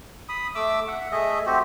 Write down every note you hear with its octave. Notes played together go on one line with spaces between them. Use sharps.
B5 D#6
A3 E5 D6 E6
E5 F#5
A3 G#4 D#5 E5
A3 C4 F#4 G4